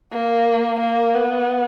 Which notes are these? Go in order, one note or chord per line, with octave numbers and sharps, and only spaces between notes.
A#3
A#3
B3